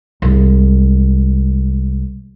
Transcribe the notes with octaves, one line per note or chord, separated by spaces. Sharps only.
C2 G#3